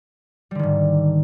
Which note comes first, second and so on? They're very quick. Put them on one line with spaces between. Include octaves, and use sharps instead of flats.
G3 D3 D#3 G#2